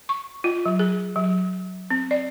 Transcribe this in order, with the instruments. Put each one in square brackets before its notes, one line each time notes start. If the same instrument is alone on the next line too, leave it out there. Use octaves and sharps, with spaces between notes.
[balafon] C#6
F4
F#3
G#4
F#3
C4
D5